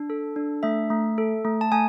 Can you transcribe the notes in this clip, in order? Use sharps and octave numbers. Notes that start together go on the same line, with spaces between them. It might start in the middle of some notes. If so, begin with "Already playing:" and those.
Already playing: D4
A4
D4
A3 E5
A3
A4
A3
A5
A3 G#5